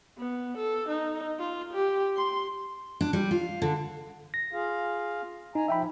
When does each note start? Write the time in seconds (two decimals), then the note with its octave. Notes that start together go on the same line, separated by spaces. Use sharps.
0.18 B3
0.57 A4
0.89 D#4
1.39 F4
1.73 G4
2.17 C6
3.01 D4
3.13 G3
3.31 F4
3.62 D3
4.34 A#6
4.53 F4 G#4 F5
5.55 D#4 G#5 A#5
5.68 F3 E5 G5 B5